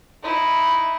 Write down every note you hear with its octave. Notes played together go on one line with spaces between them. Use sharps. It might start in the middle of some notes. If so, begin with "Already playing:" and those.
D#4 E4